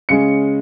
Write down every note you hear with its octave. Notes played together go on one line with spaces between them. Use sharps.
C#3 G#3 C#4 C#7